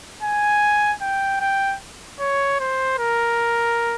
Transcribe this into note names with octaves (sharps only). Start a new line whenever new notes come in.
G#5
G5
G5
C#5
C5
A#4